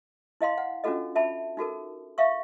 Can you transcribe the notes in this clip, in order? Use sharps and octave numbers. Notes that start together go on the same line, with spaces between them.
E4 D#5 F5 C6
F#5
C#4 D4 F4 F#4 A4 D#5
E5 A5 B5
D#4 F#4 A4 A#4
E5 F5 C#6